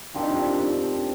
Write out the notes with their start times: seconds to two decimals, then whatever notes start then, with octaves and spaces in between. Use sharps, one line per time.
0.14 F3 C4 D4 G4 A#4
0.22 D#4
0.31 D4
0.39 D#4
0.48 D4
0.58 D4